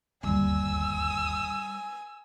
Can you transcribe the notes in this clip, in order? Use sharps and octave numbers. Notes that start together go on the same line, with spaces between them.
D1 G1 D#2 G3 G#5 E6